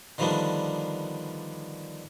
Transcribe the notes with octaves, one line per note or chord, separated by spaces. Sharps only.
D3 D#3 F3 G3 B3 D4